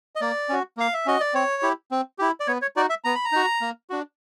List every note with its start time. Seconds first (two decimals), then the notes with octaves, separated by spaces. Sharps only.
0.15 D#5
0.21 A#3 D5
0.49 C#4 F#4
0.77 A#3 F5
0.93 E5
1.06 C#4 F#4 D#5
1.20 D5
1.34 C4 C#5
1.62 E4 G4
1.91 C4
2.19 E4 G4
2.40 D5
2.47 B3 C#5
2.62 C#5
2.76 D#4 F#4 D5
2.89 E5
3.04 B3 A#5
3.15 B5
3.25 A#5
3.32 D#4 F#4
3.61 A#3
3.90 D4 F#4